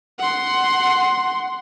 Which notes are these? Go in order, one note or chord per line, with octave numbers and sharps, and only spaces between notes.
F#5 C6